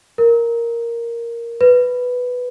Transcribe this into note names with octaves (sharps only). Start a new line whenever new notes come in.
A#4
B4